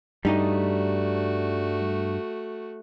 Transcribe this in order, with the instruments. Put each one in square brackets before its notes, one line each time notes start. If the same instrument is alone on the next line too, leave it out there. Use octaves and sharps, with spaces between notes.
[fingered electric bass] G2 [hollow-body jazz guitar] G3 D#4 D#5 [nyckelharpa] A3 F#4